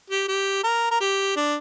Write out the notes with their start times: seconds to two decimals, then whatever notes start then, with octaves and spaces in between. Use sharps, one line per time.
0.10 G4
0.28 G4
0.64 A#4
0.91 A#4
1.00 G4
1.36 D4